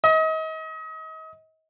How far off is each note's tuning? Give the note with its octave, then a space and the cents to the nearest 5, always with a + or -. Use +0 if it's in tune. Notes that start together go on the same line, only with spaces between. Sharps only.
D#5 +35